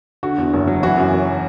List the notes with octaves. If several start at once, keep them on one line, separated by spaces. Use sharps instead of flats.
D3 F#4
E2
F#1
F#3
E3 F#4
F#2
F#1